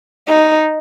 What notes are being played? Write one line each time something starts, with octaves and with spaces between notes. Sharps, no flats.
D#4